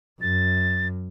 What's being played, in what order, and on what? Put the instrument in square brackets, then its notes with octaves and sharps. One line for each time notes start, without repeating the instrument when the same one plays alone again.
[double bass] F#2 [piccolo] A6